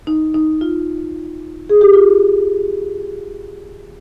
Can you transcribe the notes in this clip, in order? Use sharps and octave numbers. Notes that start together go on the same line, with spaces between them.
D#4
D#4
F4
G#4
G4
F4